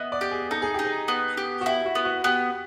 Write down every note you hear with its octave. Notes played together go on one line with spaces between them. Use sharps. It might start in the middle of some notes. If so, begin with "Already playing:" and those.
Already playing: B3 D#5 E5
D5
G4
G#4
D#4 A4
G#4
D#4 G4
G#4
B3
G4
F#4
E4 G4
F#4
B3
F#4
B3 G4